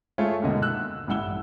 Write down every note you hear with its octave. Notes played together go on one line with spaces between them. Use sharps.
A3 F4 G#4 C#5 E5
D#2 G#2 B2 D3 A#3 D#5
E6 F#6
A1 G2 E4 F#5 E6 G7